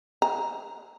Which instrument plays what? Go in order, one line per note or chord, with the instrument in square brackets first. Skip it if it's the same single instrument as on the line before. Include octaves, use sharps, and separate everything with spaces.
[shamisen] A#5